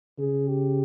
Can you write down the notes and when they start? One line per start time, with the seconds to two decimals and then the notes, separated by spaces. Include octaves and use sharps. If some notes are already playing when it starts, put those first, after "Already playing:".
0.19 C#3 G#4
0.49 G4